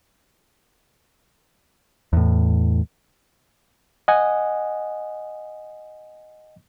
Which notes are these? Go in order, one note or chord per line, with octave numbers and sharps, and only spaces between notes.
E2 A2
D#5 F#5 G#5